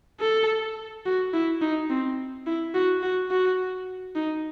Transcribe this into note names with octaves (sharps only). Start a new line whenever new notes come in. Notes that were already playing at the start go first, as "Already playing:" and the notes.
A4
F#4
E4
D#4
C4
E4
F#4
F#4
F#4
D#4